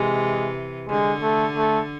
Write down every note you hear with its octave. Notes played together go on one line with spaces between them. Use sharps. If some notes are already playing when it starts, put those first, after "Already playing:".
Already playing: C3 E3 G#3
D3 G#3
A3
A3